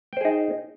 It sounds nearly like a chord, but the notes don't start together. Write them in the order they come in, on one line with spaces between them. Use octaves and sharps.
G5 C5 G#4 D#4